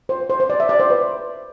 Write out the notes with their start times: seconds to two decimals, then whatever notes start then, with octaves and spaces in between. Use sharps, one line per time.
0.09 C5
0.30 C5
0.40 C5
0.50 D5
0.60 E5
0.69 D5
0.80 C5
0.90 B4